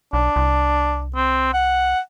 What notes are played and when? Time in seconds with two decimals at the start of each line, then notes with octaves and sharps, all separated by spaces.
0.13 B1 D4
0.36 C2
1.16 C4
1.54 F#5